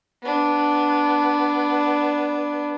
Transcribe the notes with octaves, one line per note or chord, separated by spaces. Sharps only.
B3 D4